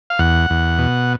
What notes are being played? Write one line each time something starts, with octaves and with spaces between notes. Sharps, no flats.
F5
E2 F#5
E2
B2